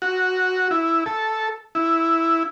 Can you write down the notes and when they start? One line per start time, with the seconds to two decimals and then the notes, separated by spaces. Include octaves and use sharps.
0.02 F#4
0.71 E4
1.06 A4
1.75 E4